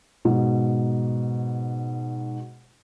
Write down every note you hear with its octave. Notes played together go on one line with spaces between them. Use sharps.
G#2 B2